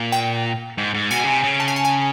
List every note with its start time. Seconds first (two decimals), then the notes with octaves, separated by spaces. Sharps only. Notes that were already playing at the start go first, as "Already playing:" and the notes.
Already playing: A#2
0.12 G5
0.78 G#2
0.94 G#2
1.11 B2 G#5
1.24 C#3
1.28 C3
1.43 C#3
1.60 A5
1.68 G#5
1.76 A5
1.85 G#5